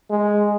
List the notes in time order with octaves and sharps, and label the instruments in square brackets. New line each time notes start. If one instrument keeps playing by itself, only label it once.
[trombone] G#3